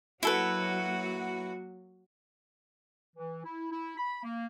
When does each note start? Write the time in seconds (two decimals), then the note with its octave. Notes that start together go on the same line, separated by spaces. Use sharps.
0.23 F#3 A#3 E4 F#4 A4 B4
3.16 E3
3.44 E4
3.71 E4
3.97 B5
4.23 A#3